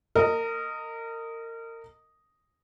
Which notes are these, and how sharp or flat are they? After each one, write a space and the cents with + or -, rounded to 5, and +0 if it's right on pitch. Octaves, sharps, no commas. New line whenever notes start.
A#4 -30 D#5 +0